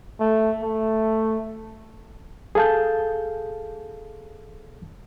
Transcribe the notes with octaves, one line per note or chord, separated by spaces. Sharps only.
A3
A3
G#4 A4 F5 A5 G6